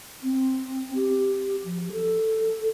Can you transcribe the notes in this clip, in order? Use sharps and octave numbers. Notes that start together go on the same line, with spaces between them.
C4
G4
F3
A4